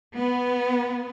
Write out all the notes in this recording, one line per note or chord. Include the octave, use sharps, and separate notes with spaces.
B3